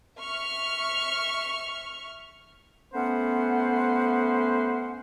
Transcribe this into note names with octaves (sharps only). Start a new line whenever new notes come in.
E5 C#6 F6
A3 B3 C#4 B4 C5 F#5